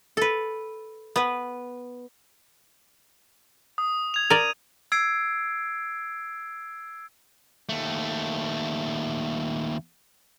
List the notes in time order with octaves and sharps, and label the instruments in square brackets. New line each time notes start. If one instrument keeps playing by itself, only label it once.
[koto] A4 B4
B3 B4
[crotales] D#6
G#6 F7
[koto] A#4 D5 [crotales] D#7
[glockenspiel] E6 G#6 C7 D7
[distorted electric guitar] D#2 A3